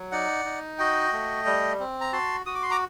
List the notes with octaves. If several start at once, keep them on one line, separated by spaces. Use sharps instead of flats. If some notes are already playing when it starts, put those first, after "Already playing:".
Already playing: F#3
D#4 D5 F#5
D#4
F#4 D#5 G5
A3
G3
C4
A#5
F#4 A5 C6
F#4 D#6
D6
C6
A#5 D6